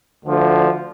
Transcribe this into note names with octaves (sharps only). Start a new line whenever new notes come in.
D2 D3 F3